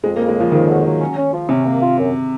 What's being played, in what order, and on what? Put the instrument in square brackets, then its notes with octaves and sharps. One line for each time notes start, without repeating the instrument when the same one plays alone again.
[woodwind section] F2 [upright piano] G#3
[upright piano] A#3
[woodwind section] C#3
[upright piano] G#3
[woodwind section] C#3 [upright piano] F3
[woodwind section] F2 [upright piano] D#3
[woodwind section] F#3
F#3
C#4
C#4
F3
[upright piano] C3 [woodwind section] C#4
[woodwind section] A#3
F4
F#2